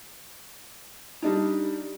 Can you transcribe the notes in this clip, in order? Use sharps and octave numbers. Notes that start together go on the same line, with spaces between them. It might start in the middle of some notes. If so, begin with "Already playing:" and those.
G3 D4 D#4